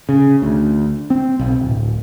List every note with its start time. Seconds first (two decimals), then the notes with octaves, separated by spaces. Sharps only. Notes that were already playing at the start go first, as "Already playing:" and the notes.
0.09 C#3
0.42 D2
1.10 C4
1.39 B1
1.61 D1